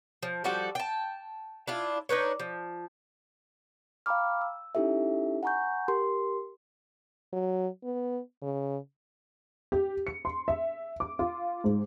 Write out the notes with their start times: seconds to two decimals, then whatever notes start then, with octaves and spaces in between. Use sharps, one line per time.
0.23 F3
0.44 F3 G3 F#4 A4
0.75 G5 A5
1.68 D4 E4 F4
2.09 D4 D#4 B4 C#5
2.39 F3
4.06 F5 G5 A#5 B5 D6 F6
4.41 E6
4.75 C#4 D#4 E4 G4 A4 E5
5.43 F#5 G#5 A#5 C#6 G6
5.88 G4 A#4 C6
7.33 F#3
7.84 B3
8.42 C#3
9.72 G4
10.07 C#7
10.25 C6
10.48 E5
11.00 D6
11.19 F4
11.64 G#2